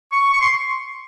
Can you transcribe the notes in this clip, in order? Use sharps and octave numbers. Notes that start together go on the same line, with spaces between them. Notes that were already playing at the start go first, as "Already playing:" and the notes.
C#6
C#6
C6